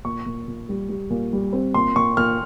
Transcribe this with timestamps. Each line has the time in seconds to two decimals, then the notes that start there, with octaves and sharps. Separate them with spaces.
0.05 A#2 C#6
0.26 A#2
0.48 A#2
0.69 G3
0.89 G3
1.10 A#2
1.33 G3
1.53 C4
1.74 A#2 C6
1.96 A#2 C#6
2.17 A#2 F6